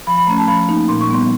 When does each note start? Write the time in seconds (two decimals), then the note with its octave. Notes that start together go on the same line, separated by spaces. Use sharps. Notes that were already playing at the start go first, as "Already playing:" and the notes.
0.07 F3 B5
0.18 B5
0.27 A3 C#4 A#5
0.38 A5
0.48 F3 B5
0.69 A#3 D#4
0.88 A#2 C6
1.01 C#6
1.09 G3 B3 C6